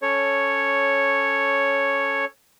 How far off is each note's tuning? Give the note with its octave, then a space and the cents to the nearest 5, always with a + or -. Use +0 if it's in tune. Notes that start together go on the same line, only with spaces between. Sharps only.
C#4 +0 A4 +0 C#5 +0